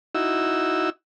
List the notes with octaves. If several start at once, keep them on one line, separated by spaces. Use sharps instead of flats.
D#4 E4 F#4 E6